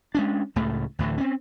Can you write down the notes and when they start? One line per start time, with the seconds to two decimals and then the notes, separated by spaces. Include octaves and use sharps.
0.15 G#3 C#4 D4
0.56 C#2 A2 C#3 A3
0.99 D2 A2 D3 E3
1.18 C4 C#4